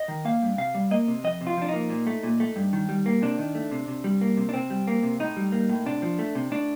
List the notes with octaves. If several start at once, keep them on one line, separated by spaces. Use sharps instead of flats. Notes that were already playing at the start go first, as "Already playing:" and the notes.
Already playing: D#5
D#3
A#3 F5
G2
C3 F5
G3
A#3 D#5
C3
F2 D#5
C3
F4
F3 D4
A#3 D#4
A#2
A3
A#2
A3
G2
D#3
G3
A#3
C3 D4
D#3
A3
C3
C3
G3
A#3
C3
D4
C3 C4
G3
A#3
C3
A2 D#4
G3
A#3
A2
C3 D4
F3
A3
C3
A2 D4